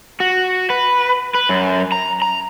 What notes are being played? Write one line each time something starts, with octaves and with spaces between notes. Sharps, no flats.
F#4
B4
B4
F#2
A#5
A#5